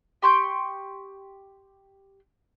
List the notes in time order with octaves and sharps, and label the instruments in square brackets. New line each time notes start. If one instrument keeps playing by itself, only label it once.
[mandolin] G4 C6 C#6 G6